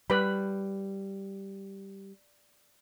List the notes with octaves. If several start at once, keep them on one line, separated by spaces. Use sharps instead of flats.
G3 B4 B5